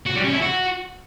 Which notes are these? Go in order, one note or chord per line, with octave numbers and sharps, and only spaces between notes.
F#4
G3
C#4
E4
F#4